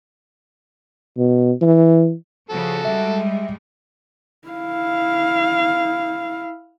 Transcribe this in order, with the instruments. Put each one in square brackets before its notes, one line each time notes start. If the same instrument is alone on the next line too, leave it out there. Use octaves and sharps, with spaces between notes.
[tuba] B2
E3
[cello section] C#3 F3 [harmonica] F#4 A4
[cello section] G3 G#3 [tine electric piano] E5
[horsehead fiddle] E4 F5